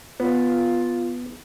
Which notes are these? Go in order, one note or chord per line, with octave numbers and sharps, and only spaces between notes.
B3 F4